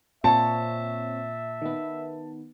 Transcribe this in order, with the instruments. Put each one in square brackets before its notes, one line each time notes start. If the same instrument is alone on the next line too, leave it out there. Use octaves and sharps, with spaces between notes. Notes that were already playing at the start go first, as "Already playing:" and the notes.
[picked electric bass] A#2 [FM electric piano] C4 C#5 [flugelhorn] E5 [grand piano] A5
[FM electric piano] D#3 B3